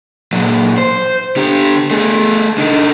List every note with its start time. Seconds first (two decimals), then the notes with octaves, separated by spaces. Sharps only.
0.32 A#2 F#3
0.78 C5
1.36 D3 G4
1.91 A3 G#4
2.58 D3 D#4